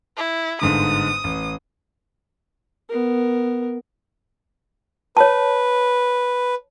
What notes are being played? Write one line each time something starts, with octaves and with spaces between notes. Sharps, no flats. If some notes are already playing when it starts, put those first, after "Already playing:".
E4
G1 G#2 D3 D#6
A1
B3 A#4
B4 C#5 A5